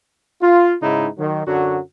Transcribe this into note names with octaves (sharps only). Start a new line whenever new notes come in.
F4
G#2 C#3 D#4 E4
D#3 F#3
F#2 D3 F#3 F#4